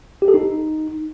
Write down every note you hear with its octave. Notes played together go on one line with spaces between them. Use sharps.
G4
A4
D#4